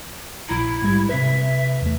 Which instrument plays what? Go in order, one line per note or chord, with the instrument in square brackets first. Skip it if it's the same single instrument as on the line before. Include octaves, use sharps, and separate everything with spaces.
[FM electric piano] A#1 A#5 [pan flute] E4
[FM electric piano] G#2 G3 G#6
[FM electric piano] C3 B4 [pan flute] E5
[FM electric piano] E2 A3